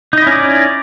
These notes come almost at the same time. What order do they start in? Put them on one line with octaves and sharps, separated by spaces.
D#4 D#5 E4 C#4 D5